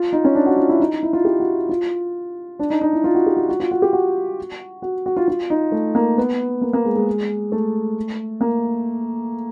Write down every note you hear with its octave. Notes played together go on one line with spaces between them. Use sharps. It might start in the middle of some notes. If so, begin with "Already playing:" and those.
Already playing: F4
D#4
C#4
D4
F#4
F4
E4
D#4
E4
F4
G4
F#4
F4
D4
D#4
D#4
E4
F4
F#4
G4
F#4
F#4
F4
F#4
G4
F#4
F#4
F#4
F4
F4
D#4
A3
A#3
B3
A#3
A#3
G#3
G#3
A3
A#3